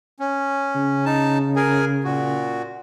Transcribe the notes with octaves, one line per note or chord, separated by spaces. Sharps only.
C#4
C#3
D#4 A5
G#4 A#4 G#5
A#2 F#4